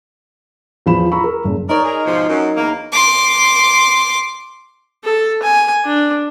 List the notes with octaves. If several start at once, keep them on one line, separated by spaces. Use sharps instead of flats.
E2 F3 B5 E7
A#5 B5 C#6 E6
A#4
F#1
D#4 A#4 C#5 D5
G#4 A#4
G#2 B2 F3
F#2
E2 A#3
C6 D6
A4
G#5
D4